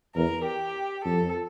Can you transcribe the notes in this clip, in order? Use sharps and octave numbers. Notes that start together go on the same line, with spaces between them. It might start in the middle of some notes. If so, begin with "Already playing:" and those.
E2 A#4
G4
F2 A4